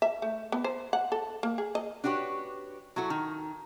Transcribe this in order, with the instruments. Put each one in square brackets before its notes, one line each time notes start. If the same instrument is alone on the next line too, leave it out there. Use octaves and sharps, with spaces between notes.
[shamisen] E5
A3
B3
C5
F#5
A4
A#3
G#4
D#5
[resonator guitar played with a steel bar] D4 F#4 G4 B4 C#5
F#3 E4 F#4 A4
D#3